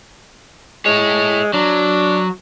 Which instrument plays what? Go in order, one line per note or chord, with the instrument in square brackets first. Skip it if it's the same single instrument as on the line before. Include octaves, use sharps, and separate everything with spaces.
[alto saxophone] G#3 [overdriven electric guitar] E4 C#5
[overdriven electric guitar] F#3 [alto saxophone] D4